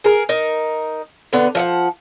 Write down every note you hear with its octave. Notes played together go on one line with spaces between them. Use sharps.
G#4 A#4
D#4 A#4
D3 B3
F3 E5 F#5